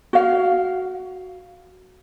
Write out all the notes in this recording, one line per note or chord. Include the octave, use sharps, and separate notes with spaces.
F#4 F5